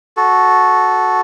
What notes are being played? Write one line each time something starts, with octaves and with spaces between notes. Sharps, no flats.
F#4 A4